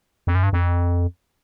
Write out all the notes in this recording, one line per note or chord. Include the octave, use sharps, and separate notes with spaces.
F2
F#2
G2
F2